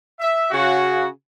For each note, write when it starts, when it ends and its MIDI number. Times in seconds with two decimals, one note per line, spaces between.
0.19 0.47 76
0.51 1.07 49
0.51 1.07 66